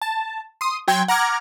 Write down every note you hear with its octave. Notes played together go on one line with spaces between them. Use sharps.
A5
C6 D#6
F#3 G5 C6 G#6
F#5 A#5 D6 F6 G#6